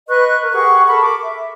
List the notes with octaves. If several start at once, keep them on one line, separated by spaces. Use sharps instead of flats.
B4 D#5 C#6 F#6
A#4
G4 G#4 F#5 C#6
A4 A#4 B5 C#6
D6
E5